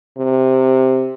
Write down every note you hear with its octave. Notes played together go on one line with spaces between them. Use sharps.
C3